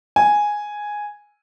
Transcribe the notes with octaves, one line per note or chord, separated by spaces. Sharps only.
G#5